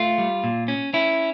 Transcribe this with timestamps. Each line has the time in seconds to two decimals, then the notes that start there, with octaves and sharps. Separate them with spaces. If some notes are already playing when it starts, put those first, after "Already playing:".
Already playing: A3 F4
0.18 G3
0.44 A#2
0.68 C#4
0.93 C#4 E4